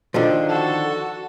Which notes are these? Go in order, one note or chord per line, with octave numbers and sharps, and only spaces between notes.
D3 D#3 F3
F#4 A4